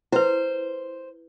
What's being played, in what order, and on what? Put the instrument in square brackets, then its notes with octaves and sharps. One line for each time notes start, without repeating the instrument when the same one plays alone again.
[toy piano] E4 B4 [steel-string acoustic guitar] C5